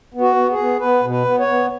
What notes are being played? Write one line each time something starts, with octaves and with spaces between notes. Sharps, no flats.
B3
F#4
B3
G#4
B3
B3 B4
B2
B4
B3
C#5
B3